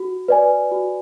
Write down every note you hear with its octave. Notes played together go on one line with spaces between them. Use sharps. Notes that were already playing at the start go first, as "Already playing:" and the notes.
Already playing: F#4
B4 D5 G#5
F#4